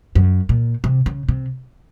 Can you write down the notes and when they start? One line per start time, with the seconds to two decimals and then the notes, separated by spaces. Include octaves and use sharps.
0.15 F#2
0.49 A#2
0.84 C3
1.06 C#3
1.29 C3